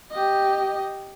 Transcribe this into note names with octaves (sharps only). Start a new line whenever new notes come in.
G4 D#5